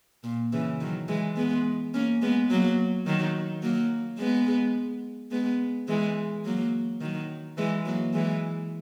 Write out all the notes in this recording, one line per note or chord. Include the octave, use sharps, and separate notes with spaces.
A#2
C#3 E3
D#3 F#3
E3 G#3
G#3 B3
A#3 C#4
G#3 B3
F#3 A#3
D#3 F#3
F#3 A#3
G#3 B3
G#3 B3
E3 G#3
F#3 A#3
D#3 F#3
E3 G#3
F#3 A#3
E3 G#3